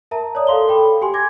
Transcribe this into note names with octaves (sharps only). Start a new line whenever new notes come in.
A#4 E5 A5 A#5
C#5 D5 D#6
A4 F5 C6 G7
A4 G5 B5
G4 G#5 C6
G#5 D6 G#6 A#6